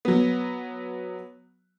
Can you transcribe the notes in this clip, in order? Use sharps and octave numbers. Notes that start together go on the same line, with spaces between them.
F#3 B3